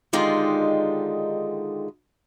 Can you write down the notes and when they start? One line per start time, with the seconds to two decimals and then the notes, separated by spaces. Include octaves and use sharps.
0.13 D3 D#3 G#3 D#4 F4 G4